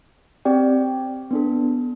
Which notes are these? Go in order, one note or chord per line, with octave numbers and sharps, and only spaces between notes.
C4 G4 D5 G5
B3 D4 A4